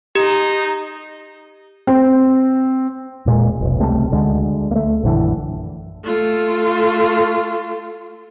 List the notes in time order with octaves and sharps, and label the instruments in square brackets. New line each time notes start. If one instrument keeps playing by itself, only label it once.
[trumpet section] D#4 [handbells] G4
[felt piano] C4
[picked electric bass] E1 A#2 G#3
F1 B1
C#2 C3 G3 A3
D2 D3 G#3
A3 A#3
A#1 F#2 D3 E3
[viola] A3 F4